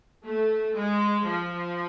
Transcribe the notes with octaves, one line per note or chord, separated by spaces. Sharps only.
A3
G#3
F3